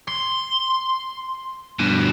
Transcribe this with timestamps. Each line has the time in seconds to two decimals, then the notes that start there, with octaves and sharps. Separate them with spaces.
0.08 C6
1.79 G2 B2